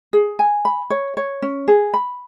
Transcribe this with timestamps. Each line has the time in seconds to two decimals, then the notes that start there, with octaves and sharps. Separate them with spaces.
0.13 G#4
0.39 G#5
0.65 B5
0.90 C#5
1.17 C#5
1.42 C#4
1.68 G#4
1.94 B5